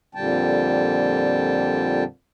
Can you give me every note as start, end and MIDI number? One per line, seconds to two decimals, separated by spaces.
0.15 2.04 41
0.15 2.04 46
0.15 2.04 50
0.15 2.04 55
0.15 2.04 79
0.15 2.04 81